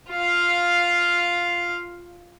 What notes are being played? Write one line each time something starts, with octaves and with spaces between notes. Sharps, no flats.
F4 F5